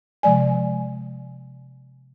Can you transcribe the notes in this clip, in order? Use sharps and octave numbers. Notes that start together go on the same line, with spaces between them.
C3 F3 G#3 D5 G#5